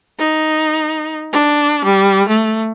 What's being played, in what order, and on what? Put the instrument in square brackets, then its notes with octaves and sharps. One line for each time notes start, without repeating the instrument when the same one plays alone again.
[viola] D#4
D4
G3
A3